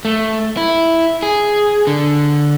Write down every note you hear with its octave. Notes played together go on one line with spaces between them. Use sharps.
A3
E4
G#4
D3